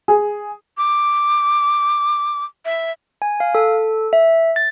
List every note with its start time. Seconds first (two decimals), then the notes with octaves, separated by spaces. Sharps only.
0.08 G#4
0.77 D6
2.65 E5
3.22 G#5
3.40 F5
3.55 A4
4.13 E5
4.56 A6